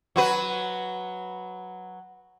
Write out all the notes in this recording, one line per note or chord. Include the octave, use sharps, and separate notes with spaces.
F#3 F#4 B4